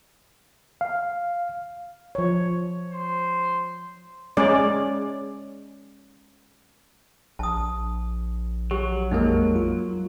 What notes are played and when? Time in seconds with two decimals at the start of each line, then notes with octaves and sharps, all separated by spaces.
0.81 F5
2.15 F3 C#5
2.92 C5
4.37 G#3 C#4 G#4 D5
7.39 A#1 A5 D#6
8.71 F#3 G4
9.11 F2 G#3 A#3 D#4 A#4
9.56 F4